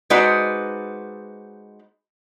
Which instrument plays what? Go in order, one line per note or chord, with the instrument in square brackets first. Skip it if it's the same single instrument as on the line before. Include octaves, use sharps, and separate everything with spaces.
[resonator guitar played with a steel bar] G#3 D#4 F#4 B4 C5 D5